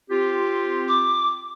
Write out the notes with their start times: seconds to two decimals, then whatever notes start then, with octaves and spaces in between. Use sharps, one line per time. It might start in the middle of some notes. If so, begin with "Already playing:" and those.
0.10 C4 F4 G4
0.88 D6